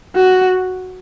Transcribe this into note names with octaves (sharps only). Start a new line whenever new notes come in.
F#4